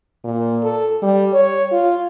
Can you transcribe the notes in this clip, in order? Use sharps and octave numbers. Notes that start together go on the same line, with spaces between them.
A#2
A4
G3
C#5
F4